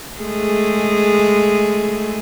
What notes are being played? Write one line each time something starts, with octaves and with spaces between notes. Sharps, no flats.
G#3 A3 G#4